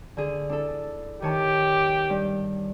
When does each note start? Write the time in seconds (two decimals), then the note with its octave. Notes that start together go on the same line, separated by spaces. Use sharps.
0.17 D3 G#4
0.50 D4 E4 A4
1.22 D#3 G4 C#5 A5
2.10 G2